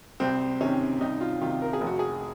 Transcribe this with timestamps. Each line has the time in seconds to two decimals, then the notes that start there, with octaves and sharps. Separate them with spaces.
0.20 C2 C4
0.61 C3 D#3 C#4
1.01 C2 D#4
1.21 F4
1.41 C3 D#3 F4
1.62 A#4
1.73 G#4
1.81 F1
1.87 F#4
1.99 G#4